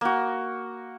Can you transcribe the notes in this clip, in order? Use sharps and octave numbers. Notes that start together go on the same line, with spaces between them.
A#3 F#4